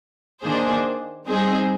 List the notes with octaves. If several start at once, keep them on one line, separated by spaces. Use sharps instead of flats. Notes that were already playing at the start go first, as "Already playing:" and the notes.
D#3 A#3 D4 G#4 C5
G3 C4 D#4 G#4 C5